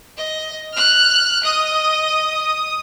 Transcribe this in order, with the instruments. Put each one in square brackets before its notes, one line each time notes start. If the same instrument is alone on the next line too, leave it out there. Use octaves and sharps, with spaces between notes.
[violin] D#5
F6 F#6
[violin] D#5 D#7 [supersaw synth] D#6